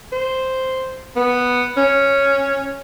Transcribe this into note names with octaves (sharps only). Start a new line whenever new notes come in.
C5
B3
C#4